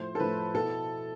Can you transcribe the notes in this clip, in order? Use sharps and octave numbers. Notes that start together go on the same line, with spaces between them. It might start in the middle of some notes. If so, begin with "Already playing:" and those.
Already playing: A2 F3 A3 C5
A4
A2 F3 A3 B4
B2 B3 E4 A4